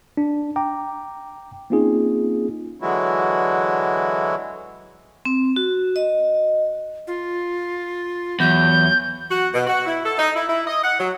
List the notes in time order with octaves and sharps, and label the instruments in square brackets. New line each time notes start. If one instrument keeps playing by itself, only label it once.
[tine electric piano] D4
G5 A#5 D6
A#3 C4 C#4 D#4 F4 G#4
[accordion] D3 E3 F#3 G#3 E4 F#4
[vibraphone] C4
F#4
D#5
[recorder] F4
[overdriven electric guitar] E2 [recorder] F#3 [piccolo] G6
[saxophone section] F#4
B2
F#4
E4
A4
D#4
E4
E4
D#5
F#5
F#3